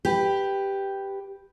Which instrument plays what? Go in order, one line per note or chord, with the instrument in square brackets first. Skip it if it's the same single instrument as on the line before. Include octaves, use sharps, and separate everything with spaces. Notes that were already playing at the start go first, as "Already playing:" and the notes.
[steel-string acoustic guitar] G4 B4